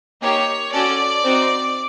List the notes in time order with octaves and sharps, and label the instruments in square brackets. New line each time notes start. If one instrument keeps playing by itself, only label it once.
[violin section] A#3 D#4 G4 C#5
C#4 F#4 A4 D5
C4 D#4 F#4